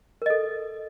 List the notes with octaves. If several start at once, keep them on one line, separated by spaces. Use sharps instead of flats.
A4 A#4 D#5